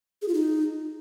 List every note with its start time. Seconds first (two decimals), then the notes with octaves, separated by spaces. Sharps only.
0.22 G#4
0.28 F4
0.34 D#4